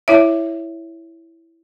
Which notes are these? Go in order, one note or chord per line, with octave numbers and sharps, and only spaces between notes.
E4 C#5 E5